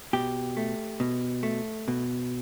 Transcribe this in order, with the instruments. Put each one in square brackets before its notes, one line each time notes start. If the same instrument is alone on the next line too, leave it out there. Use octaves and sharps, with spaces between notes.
[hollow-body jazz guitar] B2 G4
A3
B2
A3
B2